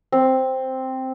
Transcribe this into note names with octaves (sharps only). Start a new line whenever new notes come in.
C4